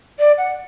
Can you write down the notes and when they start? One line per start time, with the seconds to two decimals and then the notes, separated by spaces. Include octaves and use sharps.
0.19 D5
0.38 F#5